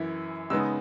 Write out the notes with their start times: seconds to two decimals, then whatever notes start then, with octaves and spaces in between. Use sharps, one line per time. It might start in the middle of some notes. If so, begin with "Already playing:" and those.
Already playing: F#2 E3 E4
0.50 C#3 G#3 B3 D#4 E6